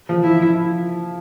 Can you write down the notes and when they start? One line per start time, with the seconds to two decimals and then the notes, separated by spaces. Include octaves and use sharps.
0.09 F3
0.23 F3 E4